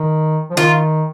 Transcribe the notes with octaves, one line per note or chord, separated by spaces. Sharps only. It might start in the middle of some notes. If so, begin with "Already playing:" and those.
Already playing: D#3
F3
D#3 F4